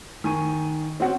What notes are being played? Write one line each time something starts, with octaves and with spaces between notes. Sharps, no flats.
D#3 G#5 C#6 D#7
C4 C#4 F#4